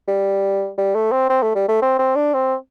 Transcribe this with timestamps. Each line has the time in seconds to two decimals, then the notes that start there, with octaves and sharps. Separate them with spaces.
0.08 G3
0.78 G3
0.95 A3
1.12 C4
1.30 C4
1.43 A3
1.55 G3
1.68 A3
1.82 C4
1.99 C4
2.16 D4
2.34 C4